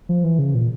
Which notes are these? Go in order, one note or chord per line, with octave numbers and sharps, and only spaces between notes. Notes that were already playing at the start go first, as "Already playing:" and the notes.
F3
E3
C#3
A#2